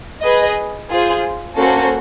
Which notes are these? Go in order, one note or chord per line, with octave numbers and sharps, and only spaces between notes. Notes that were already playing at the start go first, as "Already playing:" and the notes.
G#4 B4 D#5
F4 G#4 C5
A#3 C#4 F#4 A4 C5